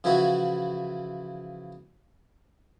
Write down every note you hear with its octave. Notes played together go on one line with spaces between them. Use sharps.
C#3 E3 F3 E4 F#4 C#5